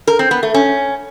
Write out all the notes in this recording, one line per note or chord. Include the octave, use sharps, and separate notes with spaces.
A#4
C4
B3
A3
C#4